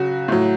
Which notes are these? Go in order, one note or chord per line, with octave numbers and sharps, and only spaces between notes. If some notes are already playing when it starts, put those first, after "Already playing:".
Already playing: C#3 F#3 F#4
A2 F#3